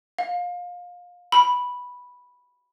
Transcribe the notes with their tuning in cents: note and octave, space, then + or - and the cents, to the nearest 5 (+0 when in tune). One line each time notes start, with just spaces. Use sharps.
F5 +25
B5 -5